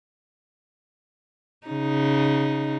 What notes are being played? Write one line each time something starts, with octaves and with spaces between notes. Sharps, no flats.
C#3 D#4